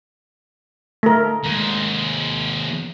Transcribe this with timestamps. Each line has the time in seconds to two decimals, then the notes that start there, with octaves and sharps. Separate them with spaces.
1.03 A3 A#4
1.43 D#2 G#3